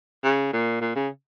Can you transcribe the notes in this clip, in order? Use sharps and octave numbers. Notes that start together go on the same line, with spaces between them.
C#3
A#2
A#2
C#3